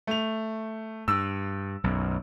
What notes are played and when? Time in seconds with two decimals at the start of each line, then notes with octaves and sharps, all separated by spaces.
0.07 A3 F7
1.08 G2 E6
1.84 B1 F#2